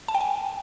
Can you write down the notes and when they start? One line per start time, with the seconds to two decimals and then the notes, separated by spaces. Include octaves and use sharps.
0.08 A5
0.15 G5
0.21 G#5